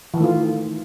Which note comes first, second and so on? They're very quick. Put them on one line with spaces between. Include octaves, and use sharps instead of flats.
E3 D#3 A3 F4